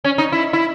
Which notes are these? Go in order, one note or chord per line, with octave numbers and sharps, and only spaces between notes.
C#4
D#4
E4
E4